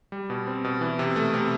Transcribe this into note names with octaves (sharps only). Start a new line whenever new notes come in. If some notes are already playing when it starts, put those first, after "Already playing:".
G3
B2
C4
B2
E3
C3
A3
C3